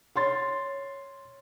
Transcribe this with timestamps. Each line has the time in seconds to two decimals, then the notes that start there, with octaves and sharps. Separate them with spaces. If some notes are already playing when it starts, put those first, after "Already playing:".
0.15 C#5 C6 A6